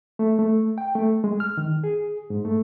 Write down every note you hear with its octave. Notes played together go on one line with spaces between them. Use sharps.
A3
A3
G5
A3
G#3
F6
D#3
G#4
G#2
A3